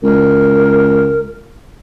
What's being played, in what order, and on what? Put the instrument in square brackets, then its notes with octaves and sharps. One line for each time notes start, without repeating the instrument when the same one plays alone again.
[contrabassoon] C#2 [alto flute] A#4